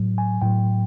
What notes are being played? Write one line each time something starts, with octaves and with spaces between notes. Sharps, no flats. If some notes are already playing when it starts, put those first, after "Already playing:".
Already playing: A2 F#3
G#5
A2 F#3 G5